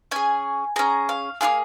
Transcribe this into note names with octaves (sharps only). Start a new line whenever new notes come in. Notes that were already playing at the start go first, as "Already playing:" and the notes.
C#4 G#4 G#5
C#4 G#4 A#5
F5
A#3 F4 G#4 F5